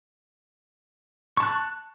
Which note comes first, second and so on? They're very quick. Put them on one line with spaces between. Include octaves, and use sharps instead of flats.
C#6 A5 F#6